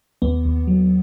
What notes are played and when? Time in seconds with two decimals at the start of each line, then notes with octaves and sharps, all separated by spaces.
0.22 D#2 B3
0.45 D#2
0.67 F#3